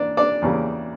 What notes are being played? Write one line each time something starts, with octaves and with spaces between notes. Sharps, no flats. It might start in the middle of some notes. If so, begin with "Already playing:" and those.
Already playing: E2 C#3 A#3 D4 D5
D4 D5
E2 C#3 G3 A#3